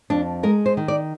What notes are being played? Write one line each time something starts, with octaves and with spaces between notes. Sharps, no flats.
F2 D4
G#3 A#4
C5
D#3
D5